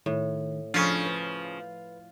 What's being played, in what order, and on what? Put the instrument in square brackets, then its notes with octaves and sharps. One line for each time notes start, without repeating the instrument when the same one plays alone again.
[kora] A2 [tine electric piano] D#3 A3
[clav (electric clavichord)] C#3 C#4 F4 [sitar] F3 [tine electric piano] D4 A4
[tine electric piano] B4